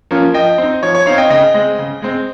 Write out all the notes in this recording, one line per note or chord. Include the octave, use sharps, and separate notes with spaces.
F3 A#3 C#4 F4
F3 D#5 G5
C4 D#4
F3 C#5
C#5
C4 D#4 C#5 F5
D#5 G5
C#3 D#5 G5
G#3 C4
C#3
G#3 C4